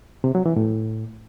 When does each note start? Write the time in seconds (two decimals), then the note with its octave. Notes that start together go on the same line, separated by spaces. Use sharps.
0.24 C3
0.35 F#3
0.46 E3
0.56 A2